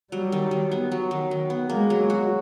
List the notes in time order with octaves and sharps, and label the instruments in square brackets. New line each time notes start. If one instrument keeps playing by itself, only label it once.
[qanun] F#3 [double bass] G3
[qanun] D#3
D#3
B3
F#3
D#3
D#3
B3
[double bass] G#3 [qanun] A#3
[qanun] F#3
F#4